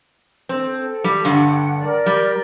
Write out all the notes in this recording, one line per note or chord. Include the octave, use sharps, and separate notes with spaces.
C4 A4
G3
G2 D3 F#5 G5
A#4 D5
G3